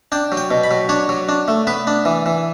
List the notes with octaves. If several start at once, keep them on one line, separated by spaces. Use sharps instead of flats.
D4 G5
F#3
G5
B2
B5
F#3
D4 C#5
F#3
D4
A3
B3 B4
D4
E3
E3